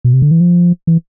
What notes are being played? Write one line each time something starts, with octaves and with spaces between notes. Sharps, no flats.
B2
C3
D3
E3
F3
E3